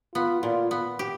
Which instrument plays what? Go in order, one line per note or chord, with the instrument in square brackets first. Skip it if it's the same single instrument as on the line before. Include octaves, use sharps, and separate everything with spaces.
[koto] B3 [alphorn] F4
[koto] A#2 [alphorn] F4
[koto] B3
G4